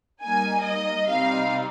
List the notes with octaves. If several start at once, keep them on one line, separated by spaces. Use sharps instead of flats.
G3 A#3 D#4 G#5
D#5
C3 G3 C4 D#4 F5